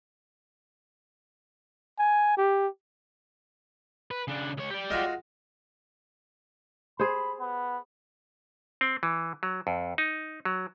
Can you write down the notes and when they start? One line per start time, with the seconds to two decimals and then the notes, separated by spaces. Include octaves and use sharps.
1.99 G#5
2.37 G4
4.11 B4
4.28 C#3 D4
4.58 C#2 C#5
4.71 G4 D5
4.90 G#3 F4 F#4
7.00 G#4 C5 B5
7.40 B3
8.81 C4
9.03 E3
9.43 F#3
9.67 F2
9.98 D#4
10.45 F#3